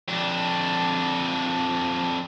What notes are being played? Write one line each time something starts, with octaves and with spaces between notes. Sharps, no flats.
F2 D4